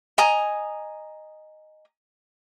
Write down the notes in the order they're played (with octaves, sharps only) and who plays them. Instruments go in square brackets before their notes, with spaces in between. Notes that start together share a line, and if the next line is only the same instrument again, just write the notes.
[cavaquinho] D#5 G#5 A#5 D#6